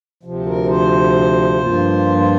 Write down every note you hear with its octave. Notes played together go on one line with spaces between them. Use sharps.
D2 C3 F3
A#4
C5
G2 F3 A#3 F4
C5